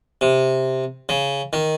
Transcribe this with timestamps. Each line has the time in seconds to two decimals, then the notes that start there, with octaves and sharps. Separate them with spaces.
0.21 C3
1.09 C#3
1.53 D#3